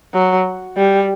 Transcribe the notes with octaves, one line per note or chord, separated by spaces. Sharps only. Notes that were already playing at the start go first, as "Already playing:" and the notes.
F#3
G3